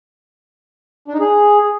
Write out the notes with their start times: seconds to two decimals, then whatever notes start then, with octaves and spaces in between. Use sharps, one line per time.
1.08 D4
1.14 D#4
1.20 G#4